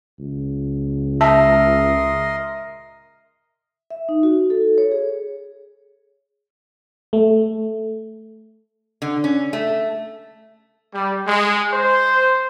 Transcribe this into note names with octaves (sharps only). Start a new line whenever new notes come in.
C#2
A#4 D#5 E5 A5 C6
E5
D#4
F#4
A4
C#5
G#4
A3
D3
C#4
A3
G3
G#3
C5